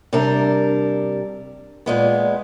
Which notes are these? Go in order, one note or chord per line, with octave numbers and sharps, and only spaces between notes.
C3 G3 D4 A#4
A#2 G#3 B3